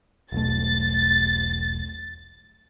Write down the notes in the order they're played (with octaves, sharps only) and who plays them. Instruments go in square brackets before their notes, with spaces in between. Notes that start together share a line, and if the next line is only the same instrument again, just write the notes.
[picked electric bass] E1 B1 A3 [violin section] A6